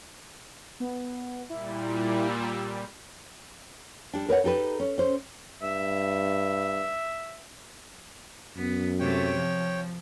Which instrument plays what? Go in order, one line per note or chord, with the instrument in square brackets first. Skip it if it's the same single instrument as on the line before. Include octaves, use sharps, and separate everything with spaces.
[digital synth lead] B3
[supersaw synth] A#2 G3 [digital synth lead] E4
[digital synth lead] E6
[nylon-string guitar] G3 D4
A#4 B4 C#5 F#5
D#4 G4 A4 B4
C#4
C#4 C5
[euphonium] G2 [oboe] E5
[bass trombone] F#2 [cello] B3
[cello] C3 A3 [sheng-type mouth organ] C#5 G5
[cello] F3